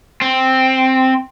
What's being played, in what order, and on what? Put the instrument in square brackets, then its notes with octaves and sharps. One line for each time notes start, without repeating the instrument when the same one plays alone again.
[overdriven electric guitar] C4